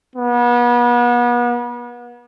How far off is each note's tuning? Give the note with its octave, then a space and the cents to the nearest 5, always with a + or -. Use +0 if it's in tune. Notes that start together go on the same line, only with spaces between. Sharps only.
B3 -35